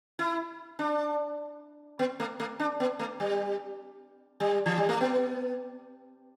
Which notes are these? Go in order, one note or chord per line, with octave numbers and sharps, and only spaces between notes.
E4
D4
B3
A3
A3
D4
B3
A3
G3
G3
E3
G3
A3
B3